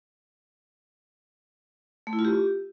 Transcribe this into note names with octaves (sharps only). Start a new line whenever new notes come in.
A3
E4
F4
G4